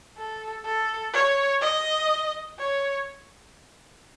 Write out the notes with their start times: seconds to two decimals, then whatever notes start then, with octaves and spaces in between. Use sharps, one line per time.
0.17 A4
0.65 A4
1.13 C#5
1.61 D#5
2.58 C#5